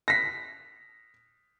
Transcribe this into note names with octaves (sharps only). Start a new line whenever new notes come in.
A#6 B6